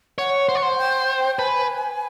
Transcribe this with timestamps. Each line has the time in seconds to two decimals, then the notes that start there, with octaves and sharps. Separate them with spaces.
0.18 C#5 F#5
0.49 C5
0.55 C#5
0.62 C5
0.78 G5
1.38 B4 G#5 A5